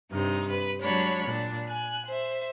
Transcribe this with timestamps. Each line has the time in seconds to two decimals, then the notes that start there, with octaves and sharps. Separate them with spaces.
0.10 G2 C3 D#4
0.50 B4
0.80 F#3 G#3 D4 C#5 B5
1.25 A#2 D4
1.67 G#5 F#6
2.05 C5 E5